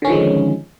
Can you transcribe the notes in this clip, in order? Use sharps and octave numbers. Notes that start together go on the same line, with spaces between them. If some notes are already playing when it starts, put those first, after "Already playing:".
D3 D#3 F3 G#3 C#4